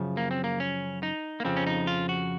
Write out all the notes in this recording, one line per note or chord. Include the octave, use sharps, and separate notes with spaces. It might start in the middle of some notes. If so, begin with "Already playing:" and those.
Already playing: F#2 C#3 F3
A#3
C4
A#3
C#4
D#4
A#3
F2 C#3 F3 C4
C#4
D#4
F4
F#4